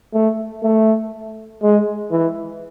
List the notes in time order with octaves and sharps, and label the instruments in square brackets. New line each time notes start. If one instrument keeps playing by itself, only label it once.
[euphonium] A3
A3
G#3
E3